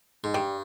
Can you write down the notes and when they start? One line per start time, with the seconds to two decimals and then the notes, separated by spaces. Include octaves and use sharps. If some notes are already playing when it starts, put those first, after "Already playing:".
0.24 G#2
0.34 G2 G3